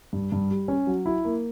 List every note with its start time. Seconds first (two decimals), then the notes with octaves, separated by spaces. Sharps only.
0.13 G2
0.32 G2
0.51 G3
0.68 C#4
0.87 F#3
1.06 E4
1.25 A#3